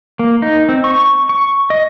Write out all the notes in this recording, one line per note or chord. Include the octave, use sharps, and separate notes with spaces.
A#3
D#4
C4
C#6
C#6
D#5